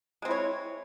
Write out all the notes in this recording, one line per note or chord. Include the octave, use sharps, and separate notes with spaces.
G#3 C4 E4 C#5